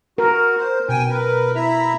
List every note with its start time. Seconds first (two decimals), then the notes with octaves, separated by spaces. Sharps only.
0.18 F#4 A#4
0.57 C5
0.89 B2 G5 G#5
1.10 A#4 B4
1.55 E4 E5 A#5